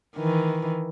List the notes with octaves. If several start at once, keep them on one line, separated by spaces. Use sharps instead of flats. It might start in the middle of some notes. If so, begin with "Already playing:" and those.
D#3 E3